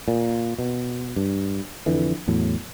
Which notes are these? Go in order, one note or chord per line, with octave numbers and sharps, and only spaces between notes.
A#2
B2
G2
F2 D3 E3
E2 A2 F#3